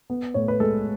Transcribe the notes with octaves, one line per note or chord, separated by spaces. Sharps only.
B3
A2 C#5
B4
G#3 A4